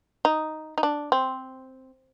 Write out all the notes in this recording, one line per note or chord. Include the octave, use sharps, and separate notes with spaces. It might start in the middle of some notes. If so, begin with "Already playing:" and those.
D#4
D#4
D4
C4